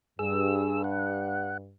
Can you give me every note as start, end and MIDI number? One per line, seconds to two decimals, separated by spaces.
0.19 1.74 43
0.19 0.82 68
0.19 0.82 88
0.84 1.57 78